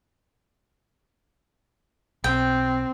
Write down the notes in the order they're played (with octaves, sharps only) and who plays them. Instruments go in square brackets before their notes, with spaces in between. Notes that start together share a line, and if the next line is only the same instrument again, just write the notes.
[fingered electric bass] B1 [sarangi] C4 [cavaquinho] G5